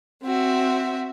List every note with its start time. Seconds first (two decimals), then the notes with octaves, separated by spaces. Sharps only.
0.23 C4 F#4 E5